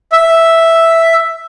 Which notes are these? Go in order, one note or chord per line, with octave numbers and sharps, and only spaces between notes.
E5